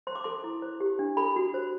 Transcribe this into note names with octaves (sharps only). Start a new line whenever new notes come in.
C5 C6
D6
A4 C6
E4
C5
G4
D4
A4 B5
F#4
C5